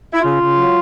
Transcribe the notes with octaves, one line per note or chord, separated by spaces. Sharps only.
E4
C#3 F4
C#3
F#3